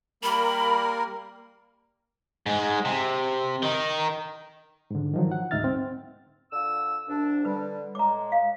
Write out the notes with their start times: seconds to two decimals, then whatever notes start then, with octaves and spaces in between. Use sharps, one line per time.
0.23 G3 A#3 A#4 B5
2.46 G#2 G#3
2.85 C3
3.62 D#3 D#4
4.91 G#2 D3
5.14 D#3 F3 F#3
5.32 F#5
5.51 D2 G#2 D#4 E5 F6 A6
5.64 C4
6.52 D3 F4 E6
7.09 C2 D4
7.45 D3 G3 B4
7.95 A2 G#3 A#5 D6
8.32 F5